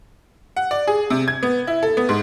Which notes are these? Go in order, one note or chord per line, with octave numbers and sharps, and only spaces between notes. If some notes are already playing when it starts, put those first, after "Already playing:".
F#5
D5
G#4
C3
G#6
B3
E4
A4
B3
G#2